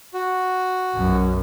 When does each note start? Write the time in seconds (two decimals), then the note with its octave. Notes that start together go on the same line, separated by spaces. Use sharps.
0.14 F#4
0.94 B1 F#2